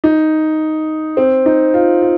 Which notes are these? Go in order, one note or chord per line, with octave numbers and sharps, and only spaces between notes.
D#4
C4
D#4
F4
F4